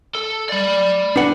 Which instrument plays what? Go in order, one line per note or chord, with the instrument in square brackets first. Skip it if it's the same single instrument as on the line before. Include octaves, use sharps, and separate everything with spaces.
[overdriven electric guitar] A4
D5 B5
[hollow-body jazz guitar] D4 B4 F#5